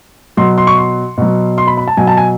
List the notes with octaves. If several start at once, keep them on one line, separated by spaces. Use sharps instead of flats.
B2 F#3 C6
C6
C#6
C6
B2 F#3
C6
B5
B5
A5
B2 F#3 G#5
A5
G#5